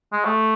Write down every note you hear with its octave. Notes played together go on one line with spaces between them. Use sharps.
G#3
A3